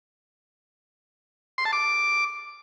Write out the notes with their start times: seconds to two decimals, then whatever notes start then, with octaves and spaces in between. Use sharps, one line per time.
1.58 C6
1.65 A5
1.73 D6